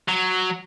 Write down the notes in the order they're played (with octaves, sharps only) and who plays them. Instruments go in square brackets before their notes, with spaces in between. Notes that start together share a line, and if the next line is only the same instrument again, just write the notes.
[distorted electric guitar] F#3